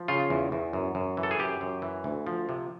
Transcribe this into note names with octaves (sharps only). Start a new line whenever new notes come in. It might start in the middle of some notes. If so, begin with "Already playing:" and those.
Already playing: F3
C#3 F4
E2
E2
F#2
F#2
E3
A4
G#4
F#2 G4
F#2
E3
D2
F3
C3